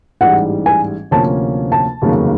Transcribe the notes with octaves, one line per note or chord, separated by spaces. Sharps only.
A1 G#2 E3 G3 F#5
G#5
D2 C3 F3 A#3 C#4 A5
A5
F1 D#2 C#3 F#3 A#3